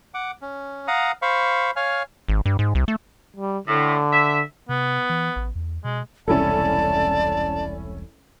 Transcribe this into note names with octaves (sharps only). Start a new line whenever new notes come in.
F#5 D6
C#4
F5 F#5 A#5 D#6
C5 F5 B5 C#6
C#5 F5 G#5 F6
G#1
G2
G#2
C2
A3
G3
A2 D3
E5
C3 B3
E3
A1
E2
B2 G#3
E1 C2 C#4 E4 A4 D5 A5